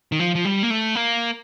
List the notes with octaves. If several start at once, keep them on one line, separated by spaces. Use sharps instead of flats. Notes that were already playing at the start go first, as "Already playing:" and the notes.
D#3
F3
F3
G3
A#3
A3
A#3